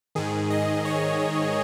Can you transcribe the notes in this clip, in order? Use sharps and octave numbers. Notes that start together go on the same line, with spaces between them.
G#2 D#3 G#4
D#5
C#5